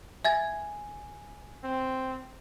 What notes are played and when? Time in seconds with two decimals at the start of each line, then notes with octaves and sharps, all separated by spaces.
0.25 E5 G#5 G#6 A6
1.64 C4